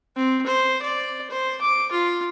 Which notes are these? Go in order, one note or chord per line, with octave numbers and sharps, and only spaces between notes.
C4
C5
D5
C5
D6
F4